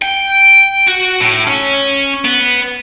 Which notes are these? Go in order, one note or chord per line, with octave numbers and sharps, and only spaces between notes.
G5
F#4
A2
C#4
B3